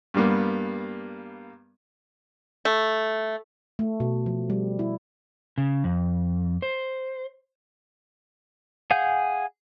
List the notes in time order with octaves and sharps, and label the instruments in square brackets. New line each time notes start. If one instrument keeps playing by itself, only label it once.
[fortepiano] G2 G3 A#3 B3
[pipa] A3
[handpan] A3
B2
F3
G3
E4
[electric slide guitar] C#3
F2
C5
[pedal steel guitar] G#4 F5 F#5 G#5 G6